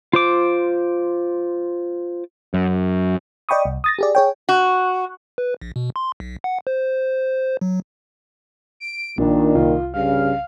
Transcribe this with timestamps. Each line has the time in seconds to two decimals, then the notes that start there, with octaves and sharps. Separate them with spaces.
0.13 F4 C5 D6
2.54 F#2
3.49 D5 D#5 G5 B5 C#6 D#6
3.65 C2
3.84 D#6 A6 A#6
3.99 G4 G#4 D5
4.15 G#4 C#5 G5
4.49 F#4
5.38 B4
5.61 A#1
5.76 B2
5.96 C6
6.20 B1
6.44 F#5
6.67 C5
7.61 F#3
8.80 D7
9.18 A#1 A#2 D#3 D4
9.56 C2 F4
9.94 G2 C#3 F5